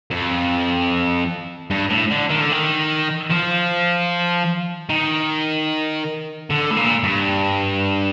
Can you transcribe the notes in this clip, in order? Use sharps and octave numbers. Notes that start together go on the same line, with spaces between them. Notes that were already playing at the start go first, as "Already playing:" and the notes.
F2
G2
A2
D3
D#3
D3
D#3
F3
D#3
D3
A2
A#2
G2